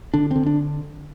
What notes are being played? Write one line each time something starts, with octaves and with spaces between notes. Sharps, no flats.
D3 D4
D3 C4
D4